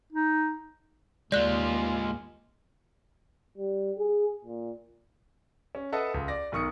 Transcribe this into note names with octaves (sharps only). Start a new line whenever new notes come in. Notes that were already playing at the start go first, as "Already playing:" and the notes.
D#4
D#2 A2 G#3 A#3 F4 D5 F#6
G3
G#4
A#2
C#4
A4 B4 D#5 E5 F#5 A5
C#2
D5 A#6
B1 D#3 C#6 D#6 C#7